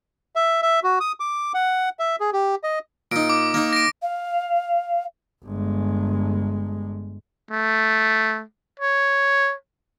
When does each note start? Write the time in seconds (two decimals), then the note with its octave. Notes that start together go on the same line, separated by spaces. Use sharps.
0.36 E5
0.62 E5
0.83 F#4
1.00 D#6
1.20 D6
1.54 F#5
1.99 E5
2.20 G#4
2.33 G4
2.63 D#5
3.12 A#2 D#4 D7
3.30 D6
3.54 A#3 D#4
3.73 A#6 D7
4.02 F5
5.44 G1 G#3
7.51 A3
8.80 C#5